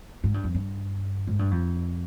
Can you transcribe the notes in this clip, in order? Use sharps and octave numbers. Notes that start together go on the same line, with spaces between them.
G#2
G2
F2
G2
G#2
G2
F2